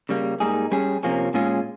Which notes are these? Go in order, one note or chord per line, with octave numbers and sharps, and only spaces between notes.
C#3 G3 A#3
G#2 G3 A#3 D#4 G#4
G3 C#4 G#4
C3 F3 A#3 C#4
A#2 G#3 C#4 F4 G#4